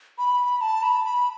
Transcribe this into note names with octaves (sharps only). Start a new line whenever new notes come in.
B5
A5
B5
B5